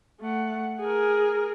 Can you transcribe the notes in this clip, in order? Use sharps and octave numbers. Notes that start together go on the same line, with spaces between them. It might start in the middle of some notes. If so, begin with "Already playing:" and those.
A3 F#5
G#4 A#4